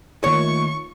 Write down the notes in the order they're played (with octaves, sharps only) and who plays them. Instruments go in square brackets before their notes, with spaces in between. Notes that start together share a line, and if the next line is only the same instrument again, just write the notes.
[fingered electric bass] D#3 A#3 [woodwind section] A3 F4 [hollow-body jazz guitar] C#5 [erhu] C#6